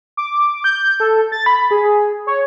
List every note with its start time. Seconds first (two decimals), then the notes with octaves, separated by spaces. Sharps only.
0.17 D6
0.64 G6
1.00 A4
1.32 A6
1.46 B5
1.71 G#4
2.27 C#5